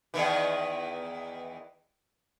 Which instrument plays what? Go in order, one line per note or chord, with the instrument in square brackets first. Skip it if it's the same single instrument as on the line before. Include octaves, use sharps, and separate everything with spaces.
[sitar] E2 D#3 E3